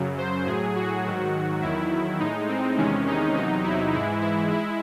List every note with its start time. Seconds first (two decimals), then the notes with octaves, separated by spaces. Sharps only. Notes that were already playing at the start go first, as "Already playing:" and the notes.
Already playing: F#2 C#3 F#3
0.18 C5
0.46 A2 F#3 G#4
0.76 F#4
1.05 G#2 D#3 F#3
1.62 E2 D#3 F#3 E4
2.20 A2 G#3 D#4
2.48 C4
2.78 E2 C3 D#3 G#3 C#4
3.07 D#4
3.35 E2 C3 F#3 D#4
3.64 E4
3.93 G#2 E3 G#3 E4
4.22 E4
4.51 G#3 E4